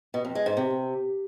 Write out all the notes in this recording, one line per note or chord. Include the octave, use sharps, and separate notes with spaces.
B2
F2
G#3
G#2
C3